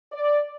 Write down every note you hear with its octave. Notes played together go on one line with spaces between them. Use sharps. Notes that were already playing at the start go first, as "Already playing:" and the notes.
D5